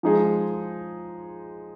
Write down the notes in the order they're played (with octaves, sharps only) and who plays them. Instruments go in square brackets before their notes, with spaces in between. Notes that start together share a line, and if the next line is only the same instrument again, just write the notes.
[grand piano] F3 G#3 D#4 G#4